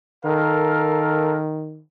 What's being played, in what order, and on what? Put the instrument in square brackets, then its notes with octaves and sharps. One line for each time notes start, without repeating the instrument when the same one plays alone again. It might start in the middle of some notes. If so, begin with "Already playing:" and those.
[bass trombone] D#3 [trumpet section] A4 A#4 F5